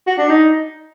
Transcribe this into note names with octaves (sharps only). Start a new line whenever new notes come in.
F#4
D4
D#4